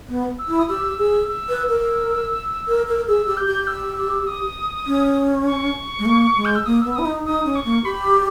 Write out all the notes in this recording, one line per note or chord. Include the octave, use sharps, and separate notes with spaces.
B3
E6
E4
D#6
G4 E6
G#4 E6
E6
B4
E6
A#4
A#4
A#4
G#4 E6
G4
G6
G4
E6
E6
D#6
C#4
C#6
G#3
A#3
G#3
G6
E6
A#3 D#6
E6
B3
E6
E4 D#6
D#4
D#4 D#6
C#4
C#6
A#3
G4 B5